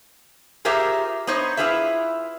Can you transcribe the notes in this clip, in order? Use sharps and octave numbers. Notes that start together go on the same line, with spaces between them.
F4 G4 G#4 A#4 C5 E5
B3 D#4 C5 C#5
E4 F4 G#4 B4 E5